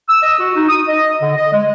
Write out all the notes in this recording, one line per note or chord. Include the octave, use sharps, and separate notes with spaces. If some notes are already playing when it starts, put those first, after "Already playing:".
E6
D#5
F#4
D#4
D#6
D#5
D3
D#5
G#3